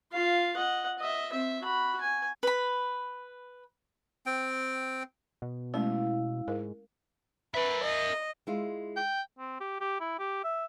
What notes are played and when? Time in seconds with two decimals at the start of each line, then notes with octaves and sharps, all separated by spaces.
0.12 F4 F5
0.57 D#5 F#5
0.99 D#5 E5
1.32 C4 E5
1.63 F#4 B5
2.01 G#5
2.43 B4 B5
4.26 C4 G5
5.42 B2
5.74 G#3 A3 C#4 E4 F5
6.48 G#2 A#4
7.54 A#4 B4 E5
7.82 D#5
8.47 G#3 E4 F4
8.97 G5
9.39 C4
9.60 G4
9.80 G4
10.00 E4
10.19 G4
10.44 E5